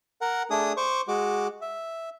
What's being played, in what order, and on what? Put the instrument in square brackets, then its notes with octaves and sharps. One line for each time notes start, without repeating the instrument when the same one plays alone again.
[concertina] A#4 F#5
A3 D4 G#4 D#6
C5 C#6 D6
G#3 F#4 D6
E5